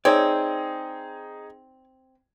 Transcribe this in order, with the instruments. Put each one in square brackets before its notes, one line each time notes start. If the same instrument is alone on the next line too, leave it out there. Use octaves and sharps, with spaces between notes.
[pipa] C4 [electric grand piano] D#4 G#4 [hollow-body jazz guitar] C#5 D5